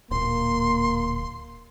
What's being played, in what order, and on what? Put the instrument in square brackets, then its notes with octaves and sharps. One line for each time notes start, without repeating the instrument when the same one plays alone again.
[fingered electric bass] D1 A#2 [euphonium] A#3 [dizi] C6